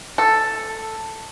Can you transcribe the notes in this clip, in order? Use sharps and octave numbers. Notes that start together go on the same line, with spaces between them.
A4